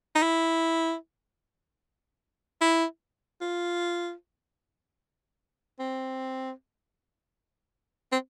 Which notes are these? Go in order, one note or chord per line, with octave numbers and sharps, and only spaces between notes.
D#4
E4
E4
F4
C4
C4